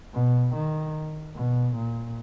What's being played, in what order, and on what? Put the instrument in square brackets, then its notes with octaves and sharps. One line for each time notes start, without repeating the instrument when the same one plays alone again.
[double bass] B2
D#3
B2
A#2